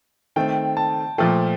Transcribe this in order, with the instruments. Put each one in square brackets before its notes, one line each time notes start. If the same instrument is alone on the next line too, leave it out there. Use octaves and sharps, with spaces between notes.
[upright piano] D#3 A3 C4 [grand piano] G5
[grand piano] A5
[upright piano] A#2 F3 A3 [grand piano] G5